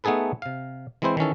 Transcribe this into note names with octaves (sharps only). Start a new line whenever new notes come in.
A3 B3 D#4 G#4 A4 B4
C3 F5
E3 G#3 C4 E4 C5
D#3 E3 C#4 A4